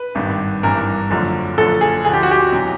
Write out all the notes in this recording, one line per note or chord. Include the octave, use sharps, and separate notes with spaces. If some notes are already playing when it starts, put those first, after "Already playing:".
Already playing: B4
G#1 G2 D#3
G#1 G2 E3 A#4
F#1 F#2 D3 F3
F#1 F#2 D3 F3 A4
G#4
D2 D3 F3 G#4
G4
F#4
G4
E2 B2 F#3